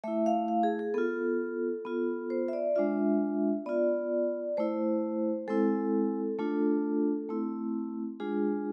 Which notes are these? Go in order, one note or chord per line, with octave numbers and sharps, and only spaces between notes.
A3 E4 E5
F5
F5
G#4
G#4
B3 F4 A4
B3 F4
C5
E5
D5
G#3 D4 F4 E5
B3 F4 D5
A3 E4 C5
G#3 C4 E4 A4
A3 D4 F4 A4
A3 C4 E4
G#3 D4 F4 G#4